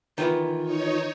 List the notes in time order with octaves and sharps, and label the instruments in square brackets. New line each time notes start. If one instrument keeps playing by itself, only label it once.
[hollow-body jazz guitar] D#3 E3 B3 [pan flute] F4
[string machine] D#4 C#5